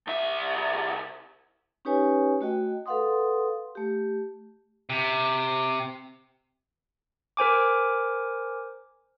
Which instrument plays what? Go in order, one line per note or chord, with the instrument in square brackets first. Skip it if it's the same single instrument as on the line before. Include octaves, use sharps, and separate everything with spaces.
[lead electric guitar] C2 E5
[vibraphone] C#4 D#4 G4 B4 C#5 G#5
A3 F#4 D#5 G5
A4 B4 F5 F#5 C6 D#6
A3 G4
[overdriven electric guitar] C3
[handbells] A#4 C5 G#5 D6